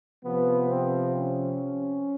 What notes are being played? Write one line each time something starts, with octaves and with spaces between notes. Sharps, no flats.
C3 F3 B3
C4
C#4